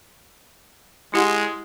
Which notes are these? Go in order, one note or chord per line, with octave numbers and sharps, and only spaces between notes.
G#3 E4 G4 F#5